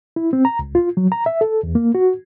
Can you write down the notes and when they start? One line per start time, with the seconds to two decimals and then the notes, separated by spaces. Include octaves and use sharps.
0.16 E4
0.33 C4
0.45 A#5
0.59 C#2
0.75 F4
0.97 F#3
1.12 A#5
1.26 E5
1.41 A4
1.63 E2
1.75 A#3
1.95 F#4